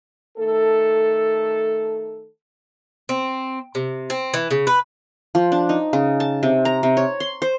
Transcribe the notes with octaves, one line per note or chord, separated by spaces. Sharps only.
D#3 A3 A4
C4
C3
C4
E3
C#3
B4
F3
D4
D#4
C#3
A5
C3
A#5
C3
C#5
C6
C5